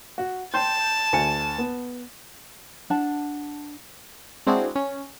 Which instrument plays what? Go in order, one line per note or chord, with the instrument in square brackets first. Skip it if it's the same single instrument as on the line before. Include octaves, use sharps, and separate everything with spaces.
[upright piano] F#4
[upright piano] G5 C6 G6 [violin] A5
[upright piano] D2 G#5 C#7
B3
[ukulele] D4 F#5 A5
[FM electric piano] G#3 C4 D4 E4 F#4 G#4
C#4